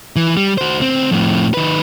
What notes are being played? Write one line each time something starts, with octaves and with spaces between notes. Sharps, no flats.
E3
G3
F#4 C5
D2 C4
F2 A2
D#3 B4